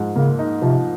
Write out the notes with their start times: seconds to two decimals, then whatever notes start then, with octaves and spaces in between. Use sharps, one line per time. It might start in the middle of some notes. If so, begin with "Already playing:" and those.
Already playing: G#2 F3
0.16 C#3 A#3
0.39 D#4
0.62 C3 F3